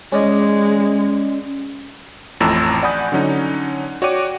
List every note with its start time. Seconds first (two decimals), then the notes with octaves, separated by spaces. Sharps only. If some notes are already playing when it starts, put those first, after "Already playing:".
0.12 G#3 C#4 D5 D#5
2.40 A1 F2 A2 A5 A#5 E6
2.83 D5 F#5 G#5 B5 D#6 G6
3.12 D3 F#3 C#4 D#4
4.02 F#4 C#5 D5 G5 D6 D#7